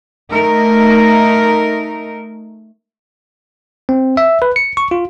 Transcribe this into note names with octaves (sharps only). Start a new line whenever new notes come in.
A3 D#4 A#4
C4
E5
B4
C#7
C#6
F4